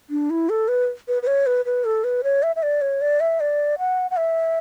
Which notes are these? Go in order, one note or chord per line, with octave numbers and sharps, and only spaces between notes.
D4
E4
A4
B4
B4
B4
C#5
B4
B4
A4
B4
C#5
E5
E5
D5
C#5
D5
E5
D5
F#5
F#5
E5